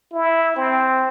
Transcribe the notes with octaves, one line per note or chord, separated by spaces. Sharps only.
E4
C4